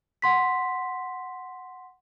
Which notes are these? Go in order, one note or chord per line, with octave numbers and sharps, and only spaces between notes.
F#5 C6 B6